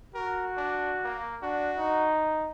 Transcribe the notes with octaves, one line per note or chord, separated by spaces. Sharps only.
F#4 A#4
D4
A#3
D4 F#4
D#4